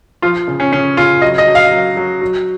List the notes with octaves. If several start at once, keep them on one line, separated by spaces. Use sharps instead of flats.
F3 F4
C#3
C#4
C#3 C#4
C#3 F4
F#3 D#5
D#5
F#3
F5
F#3
F#3
F#3